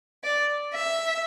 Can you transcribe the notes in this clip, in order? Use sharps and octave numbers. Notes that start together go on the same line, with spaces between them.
D5
E5